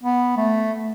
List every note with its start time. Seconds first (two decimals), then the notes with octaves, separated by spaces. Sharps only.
0.03 B3
0.37 A3